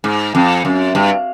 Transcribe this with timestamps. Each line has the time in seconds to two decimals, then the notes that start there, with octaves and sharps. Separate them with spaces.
0.04 G#2
0.35 F2
0.65 F#2
0.95 G2